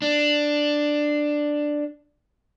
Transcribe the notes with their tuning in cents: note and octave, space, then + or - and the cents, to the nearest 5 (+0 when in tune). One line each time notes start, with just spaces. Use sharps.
D4 +5